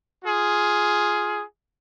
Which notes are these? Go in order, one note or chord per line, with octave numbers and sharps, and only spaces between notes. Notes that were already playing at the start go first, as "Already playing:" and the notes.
F4 G#4